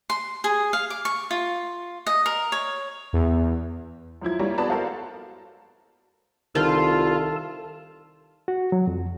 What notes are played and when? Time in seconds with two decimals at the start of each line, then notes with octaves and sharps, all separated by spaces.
0.10 C6
0.44 G#4
0.73 F5
0.90 D6
1.05 C#6
1.31 F4
2.06 D#5
2.26 A#4
2.52 C#5
3.13 E2
4.22 F#2 F3 E4 G#6
4.39 G3 A#3 E4 A#4 C#5
4.58 B3 F#4 G#4 D5 A5 B5
4.70 F#4 A4 A#4 C5 F5
6.55 C2 D#3 F4 A4 A5
8.48 F#4
8.72 F#3
8.87 F2